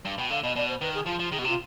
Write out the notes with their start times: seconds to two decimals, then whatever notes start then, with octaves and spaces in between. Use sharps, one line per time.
0.05 G2
0.18 B2 G5
0.30 D3 F5
0.43 B2 D#5
0.56 B2 D5
0.69 C5
0.81 D#3 B4
0.94 G#4
1.06 F3 F4
1.19 F3
1.32 D#3 G#4
1.39 B2 G4
1.44 C3
1.48 F4